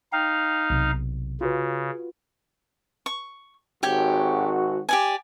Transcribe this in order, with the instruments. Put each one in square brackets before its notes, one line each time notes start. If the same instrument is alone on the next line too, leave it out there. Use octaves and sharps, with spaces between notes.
[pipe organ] D#4 F5 [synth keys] G5 F6
[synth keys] B1 C3
[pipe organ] C#3 [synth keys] F4 F#4 B4
[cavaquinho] C#6
[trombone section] G#1 F#4 [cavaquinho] G4 C#5 G5
[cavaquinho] G4 D5 G#5